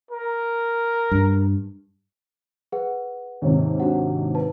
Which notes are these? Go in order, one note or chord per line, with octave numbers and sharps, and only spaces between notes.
A#4
G2
G#4 B4 F#5
D#2 G#2 C3
D4 F#4 F#5
B4 A5